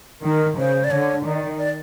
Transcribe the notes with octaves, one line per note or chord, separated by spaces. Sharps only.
D#3 A#4
C#3 C5
D5
D3 C#5
D#3 D5
D5